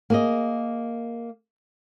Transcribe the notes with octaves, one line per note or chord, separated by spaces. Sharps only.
A#3 G#4 D#5